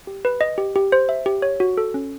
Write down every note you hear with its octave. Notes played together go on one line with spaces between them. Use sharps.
G4
B4
D#5
G4
G4
C5
E5
G4
C#5
F#4
A4
C#4